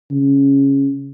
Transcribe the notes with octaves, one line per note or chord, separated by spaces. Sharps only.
C#3